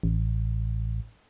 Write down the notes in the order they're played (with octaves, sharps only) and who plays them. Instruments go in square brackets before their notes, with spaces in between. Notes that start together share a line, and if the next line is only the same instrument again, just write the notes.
[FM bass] A1